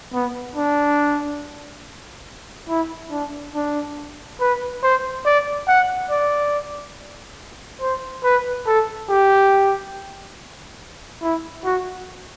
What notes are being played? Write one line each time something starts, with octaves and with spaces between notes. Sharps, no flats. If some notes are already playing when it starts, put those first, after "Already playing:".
B3
D4
E4
D4
D4
B4
C5
D5
F#5
D5
C5
B4
A4
G4
E4
F#4